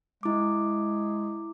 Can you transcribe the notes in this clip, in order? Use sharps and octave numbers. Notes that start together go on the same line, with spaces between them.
G#3 E4 D6